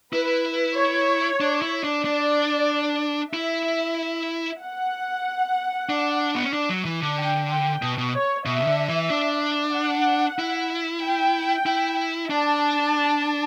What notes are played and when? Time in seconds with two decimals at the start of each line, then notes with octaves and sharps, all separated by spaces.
0.13 E4 B4
0.76 C#5
1.41 D4
1.62 E4
1.84 D4
2.05 D4 D5
3.33 E4 E5
4.60 F#5
5.89 D4
6.35 B3
6.44 C#4
6.53 D4
6.69 F#3
6.85 E3
7.02 D3
7.17 G5
7.50 G5
7.82 B2
7.98 B2
8.14 C#5
8.46 B2 E5
8.62 C#3
8.67 D3
8.89 E3
9.10 D4
9.74 F#5
10.39 E4
11.03 G5
11.66 E4
12.30 D4 A5